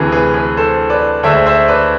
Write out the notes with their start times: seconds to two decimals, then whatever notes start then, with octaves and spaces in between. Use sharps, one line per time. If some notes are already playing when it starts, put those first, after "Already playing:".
Already playing: D2 C3 E3 G#4 B4
0.12 G#4 B4
0.34 G#4 B4
0.57 A4 C5
0.90 B4 D5
1.23 D2 D3 G#3 C5 E5
1.46 C5 E5
1.68 B4 D5